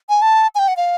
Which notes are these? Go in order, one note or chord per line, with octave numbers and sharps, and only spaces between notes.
G#5
A5
G#5
G5
F#5
F5